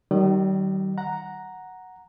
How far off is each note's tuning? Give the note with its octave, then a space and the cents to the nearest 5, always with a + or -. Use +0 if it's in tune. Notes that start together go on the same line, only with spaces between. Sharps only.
D#3 +0 G3 -40 D#5 -40
F#5 +0 A#5 +0